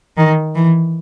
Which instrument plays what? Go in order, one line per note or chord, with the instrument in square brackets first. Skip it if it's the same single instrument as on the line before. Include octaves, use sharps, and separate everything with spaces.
[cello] D#3
E3